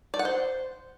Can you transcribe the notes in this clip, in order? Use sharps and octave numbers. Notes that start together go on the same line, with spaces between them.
D5
F#5
C5